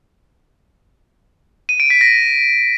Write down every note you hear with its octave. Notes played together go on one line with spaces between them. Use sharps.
D#7
D7
B6
A#6